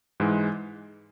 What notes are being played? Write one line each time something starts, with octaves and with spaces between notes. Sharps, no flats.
G#2 E3 G#3